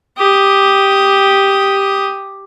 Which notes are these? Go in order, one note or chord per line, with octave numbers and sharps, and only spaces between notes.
G4 D#6